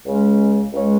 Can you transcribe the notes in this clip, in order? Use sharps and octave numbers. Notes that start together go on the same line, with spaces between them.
C#2 C#3 G#3 C#4
C#2 C#3 G#3 C#4